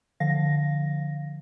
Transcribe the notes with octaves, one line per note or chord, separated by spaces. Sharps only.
D3 F3 F5 A#6